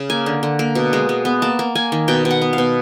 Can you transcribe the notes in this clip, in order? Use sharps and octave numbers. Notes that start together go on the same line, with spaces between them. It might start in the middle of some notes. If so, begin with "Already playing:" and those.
Already playing: C#3
A#3 G#5
D3
D3
A#3
B2
G#3
G#3
B3
A#3 A5
A#3
A#3 G#5
D#3
B2 G5
B2
F#5
B3
F5
B2